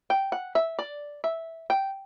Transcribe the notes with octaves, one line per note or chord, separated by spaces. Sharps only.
G5
F#5
E5
D5
E5
G5